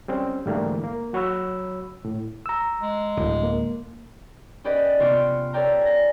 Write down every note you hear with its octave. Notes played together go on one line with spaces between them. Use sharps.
G3 C4 C#4
G#2 D3 E3 G3 A3 A#3
A#3
F#3 F#4 C#5 B5 E6
A2
A#5 E6
G#3
D1
A#3
C#4 G4 B4 D5 D#5 F#5
C3 B3 F4 G4 C#6 D6
A4 B4 C#5 D5 G5 A#5
G#5 A#6